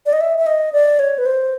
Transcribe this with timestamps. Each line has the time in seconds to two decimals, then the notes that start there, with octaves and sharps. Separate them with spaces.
0.06 D5
0.13 D#5
0.21 E5
0.38 E5
0.46 D#5
0.73 D5
0.99 C#5
1.18 B4
1.26 C5